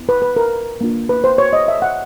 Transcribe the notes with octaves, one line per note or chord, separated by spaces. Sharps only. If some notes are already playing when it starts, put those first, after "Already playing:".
Already playing: B3 E4
B4
B4
A#4
A#3 D4 F4
B4
C5
C#5
D#5
E5
F#5